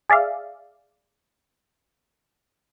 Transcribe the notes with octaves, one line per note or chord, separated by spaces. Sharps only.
G#4 D5 E5 F5